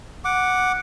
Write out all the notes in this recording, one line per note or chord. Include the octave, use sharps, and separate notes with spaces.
F#5 D6